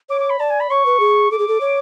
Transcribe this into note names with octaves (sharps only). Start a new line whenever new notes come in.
C#5 D6
D6
B5
D5 A5
G#5
B5
C#5 C#6
B4
G#4
A4 D6
G#4
A4
C#5